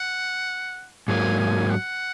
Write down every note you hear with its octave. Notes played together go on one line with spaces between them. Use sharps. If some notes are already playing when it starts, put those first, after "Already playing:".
Already playing: F#5
G#2 F#3 A#3 G#5
G#5
F#5